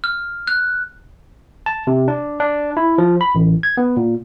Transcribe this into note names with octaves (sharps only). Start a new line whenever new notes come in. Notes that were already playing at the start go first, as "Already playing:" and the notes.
F6
F#6
A5
C3
D4
D4
E4
F3
B5
A1
G#6
B3
A#2